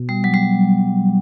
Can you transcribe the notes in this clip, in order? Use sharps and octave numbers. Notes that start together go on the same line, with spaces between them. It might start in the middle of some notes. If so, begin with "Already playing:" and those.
Already playing: B2
G3
F#3
G3